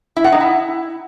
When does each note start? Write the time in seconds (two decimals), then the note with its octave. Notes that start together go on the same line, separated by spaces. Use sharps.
0.16 E4
0.24 F#5
0.32 D#4
0.40 E4